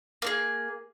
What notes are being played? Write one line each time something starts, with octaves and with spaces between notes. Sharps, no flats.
A#3 D4 G#4